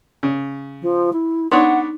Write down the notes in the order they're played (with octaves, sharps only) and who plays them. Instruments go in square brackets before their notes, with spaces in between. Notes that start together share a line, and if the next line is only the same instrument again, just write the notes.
[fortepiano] C#3
[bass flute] F3
E4
[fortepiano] B3 D4 C#5 [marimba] D#4 C6 [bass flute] F#5